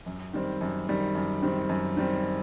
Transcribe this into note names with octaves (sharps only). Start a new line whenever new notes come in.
F#2
D#3 G3 C4
F#2
D#3 G3 C4
F#2
D#3 G3 C4
F#2
D#3 G3 C4